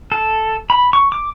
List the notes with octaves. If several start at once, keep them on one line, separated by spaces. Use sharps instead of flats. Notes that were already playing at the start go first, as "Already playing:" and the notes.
A4
B5
C#6
D6